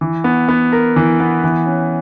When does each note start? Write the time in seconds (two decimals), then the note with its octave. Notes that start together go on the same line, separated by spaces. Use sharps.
0.01 E3
0.24 B3
0.49 B3
0.72 A#4
0.96 E3
1.20 B3
1.44 E3
1.66 C#4